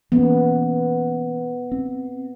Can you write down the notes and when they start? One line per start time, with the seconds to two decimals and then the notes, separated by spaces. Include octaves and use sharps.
0.12 E3 A#3 B3 C#4
1.72 C4